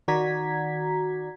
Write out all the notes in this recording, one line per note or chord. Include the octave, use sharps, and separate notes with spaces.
D#3 F#4 D5 A#5 G#6 B6